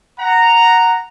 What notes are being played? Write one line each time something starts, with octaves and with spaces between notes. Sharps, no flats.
F#5 A#5